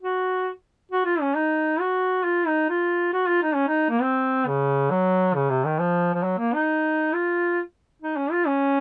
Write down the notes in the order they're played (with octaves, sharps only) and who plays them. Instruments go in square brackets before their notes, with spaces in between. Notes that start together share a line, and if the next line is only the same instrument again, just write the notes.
[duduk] F#4
F#4
F4
C#4
D#4
F#4
F4
D#4
F4
F#4
F4
D#4
C#4
D#4
A#3
C4
C#3
F#3
C#3
C3
D#3
F3
F3
F#3
A#3
D#4
F4
D#4
C#4
F4
C#4